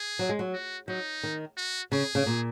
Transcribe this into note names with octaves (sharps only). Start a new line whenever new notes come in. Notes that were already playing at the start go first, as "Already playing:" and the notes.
Already playing: G#4
F#3
G#3
F#3
F#4
F#3 D#4
D#3
F#4
C#3 G#4
C#3
A#2